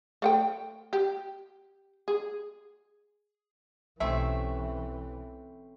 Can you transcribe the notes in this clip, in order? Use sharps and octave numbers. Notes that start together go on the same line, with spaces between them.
A3 F#5 G5
G4
G#4
B1 C3 E3 A3 C4 C#4 D#4 E5